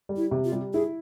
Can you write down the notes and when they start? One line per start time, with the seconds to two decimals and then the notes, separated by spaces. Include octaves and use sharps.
0.09 G3
0.17 E4
0.31 C3
0.45 F4
0.52 G3
0.74 E4 G#4